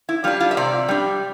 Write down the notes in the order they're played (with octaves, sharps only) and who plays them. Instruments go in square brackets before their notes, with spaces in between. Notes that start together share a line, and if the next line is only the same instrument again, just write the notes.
[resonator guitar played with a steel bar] E4
G3 D4 F4
F4
E5
C3 D5
G3 D4